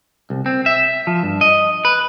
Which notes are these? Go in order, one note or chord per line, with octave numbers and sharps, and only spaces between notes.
C2
C4
E5
F3
G2
D#5
B4